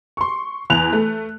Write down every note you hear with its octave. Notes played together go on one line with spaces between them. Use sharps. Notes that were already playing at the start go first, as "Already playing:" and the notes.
C6 C#6
E2 F#6 F7
A3